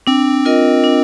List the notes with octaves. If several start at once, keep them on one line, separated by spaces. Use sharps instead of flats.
C4 D4
F4 A#4 D#5
D4